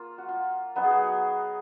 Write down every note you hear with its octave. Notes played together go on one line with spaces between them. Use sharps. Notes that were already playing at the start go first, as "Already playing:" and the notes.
Already playing: A#3 F4
F#4
F4
F#3 B3 D#4 F#4
G#4
F#4